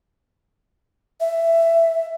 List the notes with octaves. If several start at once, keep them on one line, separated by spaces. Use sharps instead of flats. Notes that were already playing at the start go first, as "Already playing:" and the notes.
E5